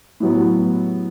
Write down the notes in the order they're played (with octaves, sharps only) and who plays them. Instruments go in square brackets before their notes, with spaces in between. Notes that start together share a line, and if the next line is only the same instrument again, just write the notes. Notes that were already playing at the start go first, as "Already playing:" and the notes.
[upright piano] A2 F#3 B3